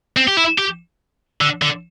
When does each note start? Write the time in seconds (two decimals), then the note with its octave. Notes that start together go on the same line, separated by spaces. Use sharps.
0.17 C4
0.28 G4
0.37 E4
0.58 G4
1.41 D3
1.62 D3